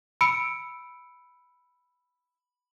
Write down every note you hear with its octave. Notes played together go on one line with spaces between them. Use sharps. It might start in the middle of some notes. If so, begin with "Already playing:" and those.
B5 E6 C#7 D7